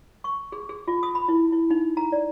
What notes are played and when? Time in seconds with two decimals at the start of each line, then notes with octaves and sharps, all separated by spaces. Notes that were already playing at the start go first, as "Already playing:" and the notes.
0.24 C#6
0.52 G#4
0.69 G#4
0.88 F4
1.03 D#6
1.15 B5
1.28 E4
1.52 E4
1.70 D#4
1.97 A#5
2.12 D5